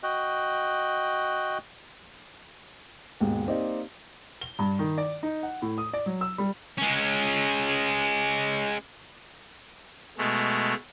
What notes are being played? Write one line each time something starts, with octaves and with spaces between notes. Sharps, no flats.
F#4 D#5 G5 F#6
D#2 G#2 B2 G#3
A#3 C4 D#4 G4 D5 D#5
G7
G2
D#3
D5
D#4
F#5
A2
D#6
D5
F#3
E6
G3
G#3 C#4
B2 G#3 A3